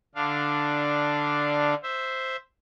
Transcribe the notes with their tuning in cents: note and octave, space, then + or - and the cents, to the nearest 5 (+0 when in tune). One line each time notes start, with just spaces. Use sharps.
D3 +0 D4 +5 F5 +0
C5 +0 E5 +0